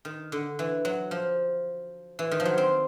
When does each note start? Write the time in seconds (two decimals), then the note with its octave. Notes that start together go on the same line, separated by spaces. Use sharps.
0.05 D#3
0.32 D3
0.59 E3
0.85 F#3
1.11 F3
2.19 E3
2.31 D#3
2.40 F3
2.45 F#3
2.58 C4